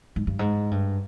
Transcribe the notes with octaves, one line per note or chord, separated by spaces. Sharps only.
G#2
G2
G#2
G2